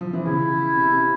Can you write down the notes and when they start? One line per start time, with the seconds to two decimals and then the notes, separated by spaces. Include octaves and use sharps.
0.01 F3
0.13 E3
0.26 C#3 E4
0.76 C3
0.92 C3